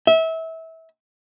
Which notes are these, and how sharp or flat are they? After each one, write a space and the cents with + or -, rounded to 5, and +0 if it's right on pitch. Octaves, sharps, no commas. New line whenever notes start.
E5 -25